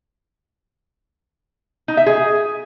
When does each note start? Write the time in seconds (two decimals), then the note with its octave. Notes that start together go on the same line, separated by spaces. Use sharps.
1.88 D#4
1.97 E5
2.06 G#4